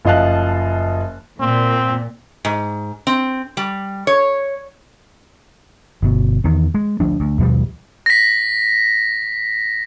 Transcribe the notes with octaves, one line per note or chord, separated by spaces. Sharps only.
F#1 F3 D#5 F5 A5 F#6
A#2 C4
G#2
C4
G3
C#5
G1 B2
E2 D#3
G#3
D2 F3 D4
D2
D#2 B2 F3 G3
A#6 B6